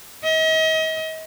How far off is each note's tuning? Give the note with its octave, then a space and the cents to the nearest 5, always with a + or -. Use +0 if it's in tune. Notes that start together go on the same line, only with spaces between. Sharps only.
D#5 +40